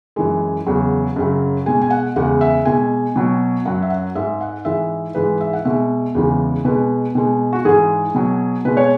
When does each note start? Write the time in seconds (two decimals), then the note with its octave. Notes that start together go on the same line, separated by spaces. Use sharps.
0.16 F#2 E3 G#3
0.66 E2 C#3 F#3
1.16 F#2 C#3 F#3
1.66 B2 G#3 G#5
1.81 G#5
1.90 F#5
2.16 E2 C#3 G#3 F#5
2.41 E5
2.65 B2 G#3 G#5
3.16 B2 F#3
3.65 F#2 F#3 F#5
3.82 E5
3.90 F#5
4.15 G#2 G#3 E5
4.41 F#5
4.65 G#2 E3 G#3 E5
5.15 G#2 E3 G#3 B4
5.41 E5
5.53 F#5
5.65 B2 G#3 E5
6.15 E2 C#3 E3 G#3
6.65 B2 G#3 B4
7.15 B2 G#3
7.53 F#4
7.65 G#2 E3 G#3 G#4
8.15 B2 F#3
8.65 B2 G#3 B4
8.77 C#5